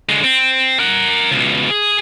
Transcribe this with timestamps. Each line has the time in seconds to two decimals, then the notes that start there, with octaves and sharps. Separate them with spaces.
0.09 D3 G#3
0.24 C4
0.80 A#4 F#5
1.32 C#2 B2
1.70 G#4